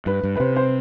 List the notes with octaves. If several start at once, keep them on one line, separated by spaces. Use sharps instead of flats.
G2 B4
G2
B4
C3 C5
C5